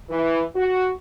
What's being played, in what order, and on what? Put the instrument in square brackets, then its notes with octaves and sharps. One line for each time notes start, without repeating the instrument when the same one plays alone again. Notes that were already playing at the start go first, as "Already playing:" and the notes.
[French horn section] E3
F#4